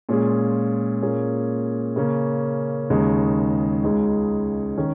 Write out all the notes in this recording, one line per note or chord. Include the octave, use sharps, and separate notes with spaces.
A#2 G#3 C#4 F4 G#4
A#2 A#3 C#4 G#4
C#3 A#3 C#4
D#2 C#3 G#3 D#4
C#2 C#3 G#3 D#4 G#4
D#3 C#4